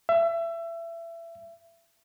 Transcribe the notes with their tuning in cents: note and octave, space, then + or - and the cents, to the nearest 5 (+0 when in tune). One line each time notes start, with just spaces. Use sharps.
E5 +25